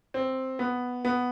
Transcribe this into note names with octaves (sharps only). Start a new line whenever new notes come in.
C4
B3
B3